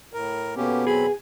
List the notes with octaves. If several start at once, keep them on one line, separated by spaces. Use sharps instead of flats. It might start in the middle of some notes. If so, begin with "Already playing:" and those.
A2 A#4
B2 A#3 B3 C#4 G4 A4
F#3 C4 G#4 B5